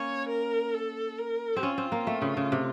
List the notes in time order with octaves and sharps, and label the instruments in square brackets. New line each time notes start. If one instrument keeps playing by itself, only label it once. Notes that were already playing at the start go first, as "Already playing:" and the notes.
Already playing: [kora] A#3 C#4 [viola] C#5
[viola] A#4
A4
A#4
[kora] C4
[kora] C#4 [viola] F4
[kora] C4
A#3
A3
C#3
C#3
C3